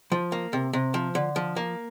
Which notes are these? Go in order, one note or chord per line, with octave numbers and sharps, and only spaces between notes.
F3
A#3
C3
C3
F3
D3
F3
A#3